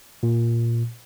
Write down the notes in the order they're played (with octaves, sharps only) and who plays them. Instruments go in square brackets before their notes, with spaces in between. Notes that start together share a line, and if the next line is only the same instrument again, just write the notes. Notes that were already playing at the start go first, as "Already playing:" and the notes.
[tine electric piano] A#2